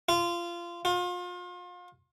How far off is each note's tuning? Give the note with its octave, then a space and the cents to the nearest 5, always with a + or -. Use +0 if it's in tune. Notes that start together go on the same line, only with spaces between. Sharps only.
F4 -20
F4 +35